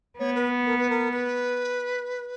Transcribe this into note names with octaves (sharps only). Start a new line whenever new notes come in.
B3 C#5
B4
A#4
B4
A#4
B4